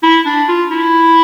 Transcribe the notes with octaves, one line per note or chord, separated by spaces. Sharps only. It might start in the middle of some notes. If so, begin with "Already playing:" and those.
E4
D4
F4
E4